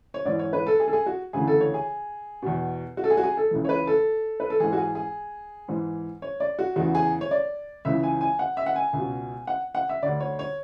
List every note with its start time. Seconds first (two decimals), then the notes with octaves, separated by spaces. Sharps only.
0.14 C#5
0.25 G#2 E3 D5
0.39 C#5
0.53 B4
0.67 A4
0.80 G#4
0.88 A4
0.93 G#4
1.06 F#4
1.33 D2 C#3 E3 G#4
1.47 A4
1.61 C#5
1.74 G#4
2.42 E2 B2
2.97 F#4
3.04 A4
3.10 G#4
3.17 F#4
3.23 G#4
3.37 A4
3.51 C#2 C#3 E3
3.65 C#5
3.69 B4
3.87 A4
4.40 B4
4.50 A4
4.60 G#2 E3 G#4
4.73 F#4
4.77 G#4
4.95 G#4
5.68 G#2 E3
6.22 C#5
6.40 D5
6.59 F#4
6.76 E2 C#3 E3 F#4
6.95 G#4
7.21 C#5
7.31 D5
7.85 C#2 C#3 E3 E5
8.03 G#5
8.21 G#5
8.39 F#5
8.57 E5
8.66 F#5
8.76 G#5
8.93 C#2
8.99 B2
9.47 F#5
9.75 F#5
9.89 E5
10.02 D2 D3 D5
10.20 C#5
10.39 C#5